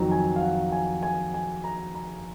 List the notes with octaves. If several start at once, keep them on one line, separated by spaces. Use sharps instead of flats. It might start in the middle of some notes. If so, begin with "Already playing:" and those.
Already playing: F2 D#3 F#3 A#5
G#5
F5
F#5
G#5
G#5
G#5
A#5
A#5